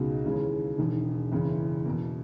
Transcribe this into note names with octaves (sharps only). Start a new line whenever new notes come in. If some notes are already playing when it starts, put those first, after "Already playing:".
Already playing: C#2 B2 G#3 D#4 F#4
D#2 C#3 E3 G#3
E1 E2 D#3
F#1 E2 C#3 E3
E2 B2 A#3